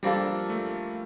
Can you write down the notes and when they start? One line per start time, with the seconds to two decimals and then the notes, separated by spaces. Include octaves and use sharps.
0.03 F3 G3 A#3 D4 F4 A4
0.49 A3